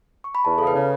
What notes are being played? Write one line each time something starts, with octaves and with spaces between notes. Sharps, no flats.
C#6
B5
E2 A5
C#3 A4
B4
C#3